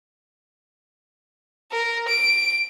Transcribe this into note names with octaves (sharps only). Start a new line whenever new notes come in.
A#4
D7